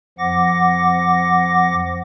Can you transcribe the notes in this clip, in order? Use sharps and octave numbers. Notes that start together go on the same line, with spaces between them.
F2 F3 F#5 D6 A#6